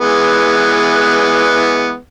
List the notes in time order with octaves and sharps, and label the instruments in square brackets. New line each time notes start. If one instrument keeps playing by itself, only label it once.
[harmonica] E3 G#3 B3